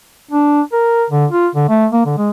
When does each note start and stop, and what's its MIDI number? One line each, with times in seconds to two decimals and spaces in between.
0.31 0.61 62
0.73 1.05 70
1.10 1.26 50
1.31 1.48 65
1.55 1.67 50
1.69 1.86 57
1.93 2.03 58
2.06 2.14 50
2.17 2.31 56